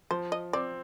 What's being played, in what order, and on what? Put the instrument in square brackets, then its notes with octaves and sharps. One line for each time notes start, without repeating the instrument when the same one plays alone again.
[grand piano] F3 [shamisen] C5
[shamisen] D#5
[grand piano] C4 [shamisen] D5